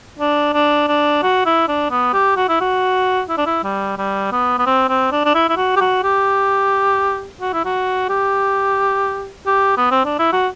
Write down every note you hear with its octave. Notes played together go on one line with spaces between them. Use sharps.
D4
D4
D4
F#4
E4
D4
B3
G4
F#4
E4
F#4
E4
D4
E4
G3
G3
B3
B3
C4
C4
D4
D4
E4
E4
F#4
G4
F#4
G4
F#4
E4
F#4
G4
G4
B3
C4
D4
E4
F#4